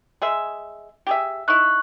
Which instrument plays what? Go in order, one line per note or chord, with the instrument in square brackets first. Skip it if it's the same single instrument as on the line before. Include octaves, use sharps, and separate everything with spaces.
[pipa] G#3 G#4 E5
G4 G#4 E5
[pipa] D#4 E4 [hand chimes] C#6 F#6